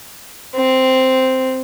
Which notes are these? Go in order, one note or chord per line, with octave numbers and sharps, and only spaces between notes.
C4